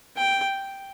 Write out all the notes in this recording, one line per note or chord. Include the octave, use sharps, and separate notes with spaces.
G5